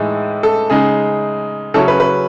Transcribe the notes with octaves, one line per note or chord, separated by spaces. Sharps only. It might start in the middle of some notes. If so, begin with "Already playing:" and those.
Already playing: A2 E3 G#3 D#4
A4
C#3 G#3 D#4 G#4
C#3 F#3 C#4 E4 A4
B4
B4